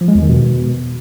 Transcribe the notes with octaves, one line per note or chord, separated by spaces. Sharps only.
F3
G#3
E2
D#3
B2